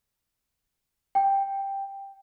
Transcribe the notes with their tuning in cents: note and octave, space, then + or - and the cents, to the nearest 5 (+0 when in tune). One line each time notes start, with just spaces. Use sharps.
G5 +5